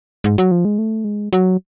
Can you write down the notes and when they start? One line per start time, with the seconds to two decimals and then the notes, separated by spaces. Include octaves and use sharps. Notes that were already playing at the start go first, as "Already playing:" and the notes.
0.24 G#2
0.38 F#3
0.51 F3
0.65 G#3
0.78 A3
1.04 G#3
1.33 F#3